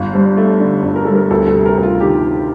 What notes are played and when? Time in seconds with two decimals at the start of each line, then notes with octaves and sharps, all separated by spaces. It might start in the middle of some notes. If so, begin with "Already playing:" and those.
Already playing: G1 F5
0.14 G2 C5
0.25 D5
0.37 A3
0.60 D3 D5
0.83 G1
0.96 A#4
1.05 G2 A4
1.15 A#4
1.30 D2 A4
1.48 A4
1.54 C3
1.66 A#4
1.77 D2
1.83 F4
2.01 D#3 G4